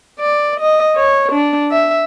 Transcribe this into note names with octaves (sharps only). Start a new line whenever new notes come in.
D5
D#5
C#5
D4
E5